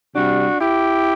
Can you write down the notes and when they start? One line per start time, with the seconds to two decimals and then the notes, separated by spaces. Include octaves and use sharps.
0.14 C3 G3 D4 F#4
0.60 E4 G4